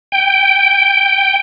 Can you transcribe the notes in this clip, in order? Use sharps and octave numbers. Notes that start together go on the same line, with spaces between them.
G5